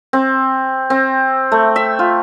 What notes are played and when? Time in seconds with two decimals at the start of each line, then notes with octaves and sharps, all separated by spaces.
0.13 C4
0.90 C4
1.52 A3
1.76 E5
1.99 F4